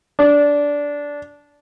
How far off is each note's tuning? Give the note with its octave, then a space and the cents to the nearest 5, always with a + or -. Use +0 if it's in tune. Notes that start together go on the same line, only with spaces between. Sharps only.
D4 -15